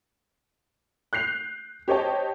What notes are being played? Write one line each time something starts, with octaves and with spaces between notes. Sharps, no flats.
F#6 G6 C7 F7
G4 C5 C#5 D#5 G5 A5